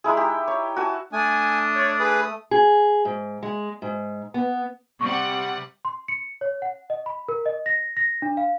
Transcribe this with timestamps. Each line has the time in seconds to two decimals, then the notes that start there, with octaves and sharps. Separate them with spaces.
0.04 G#3 D#4 E4 G#4
0.17 G4
0.48 C#5
0.76 F#4 G#5 A5
1.13 A3 D4 G#5 D#6
1.76 C#5
1.99 G#4 B4
2.51 G#4
3.05 G#2
3.43 G#3
3.82 G#2
4.34 B3
5.01 C3 G3 F#5 C#6
5.85 C6
6.08 C#7
6.41 C#5
6.62 F#5
6.90 D#5
7.06 B5
7.29 A#4
7.46 D#5
7.66 A#6
7.97 A#6
8.22 D4
8.37 F5